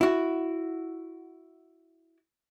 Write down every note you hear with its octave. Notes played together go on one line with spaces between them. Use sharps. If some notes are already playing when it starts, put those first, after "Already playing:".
E4 F#4